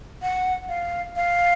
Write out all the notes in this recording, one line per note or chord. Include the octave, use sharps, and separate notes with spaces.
F#5
F5
F5